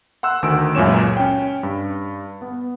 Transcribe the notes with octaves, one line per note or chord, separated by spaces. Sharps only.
F#5 C6 E6 F#6
D2 D#3 E6 D7
C#2 F#2 A#2 C#4 C#5 E7
C#4 G5
G2
B3